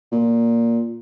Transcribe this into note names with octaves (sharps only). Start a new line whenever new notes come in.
A#2